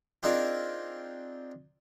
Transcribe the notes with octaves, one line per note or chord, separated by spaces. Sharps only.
C4 D4 D#4 F4 G#4 A#4